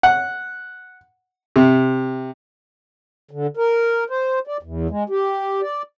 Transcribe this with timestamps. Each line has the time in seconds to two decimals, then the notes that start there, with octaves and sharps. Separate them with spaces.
0.03 F#5
1.56 C3
3.31 D3
3.57 A#4
4.10 C5
4.47 D5
4.63 E2
4.90 G#3
5.10 G4
5.62 D5